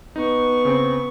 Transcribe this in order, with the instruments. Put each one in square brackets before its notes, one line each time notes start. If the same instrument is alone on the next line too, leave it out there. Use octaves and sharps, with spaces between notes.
[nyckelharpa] B3 C#6 [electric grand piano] D#4
[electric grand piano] C#3 C4